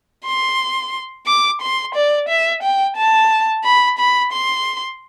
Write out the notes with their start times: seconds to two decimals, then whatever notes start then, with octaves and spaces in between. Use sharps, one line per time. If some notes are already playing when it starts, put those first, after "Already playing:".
0.25 C6
1.27 D6
1.62 C6
1.95 D5
2.29 E5
2.63 G5
2.97 A5
3.64 B5
3.98 B5
4.33 C6